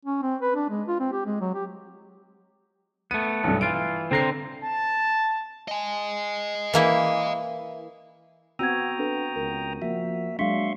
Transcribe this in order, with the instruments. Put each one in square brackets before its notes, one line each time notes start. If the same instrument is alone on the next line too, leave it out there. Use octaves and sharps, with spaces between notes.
[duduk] C#4
C4
B4
D4
G#3
F4
C4
G4
G#3
F#3
G4
[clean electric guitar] A3 B3 [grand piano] D#7
[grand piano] B1 G2
[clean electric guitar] E3 F4 [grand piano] D7
[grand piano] D3 C7 [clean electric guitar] C4 C5 A#5
[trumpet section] A5
[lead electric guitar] D#5 G#5
[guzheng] E3 A#3 E4
[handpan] B3 C4 F#4 [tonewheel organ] G5 A#5 D#6 [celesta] E6 G#6
[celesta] D4 A4 B4
[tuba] C#2 [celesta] A#4
[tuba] F3 [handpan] A#3 F#4 [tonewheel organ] E5
[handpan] F#3 D4 [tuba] G#3 [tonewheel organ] E5 C6 C#6 [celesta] F5 B6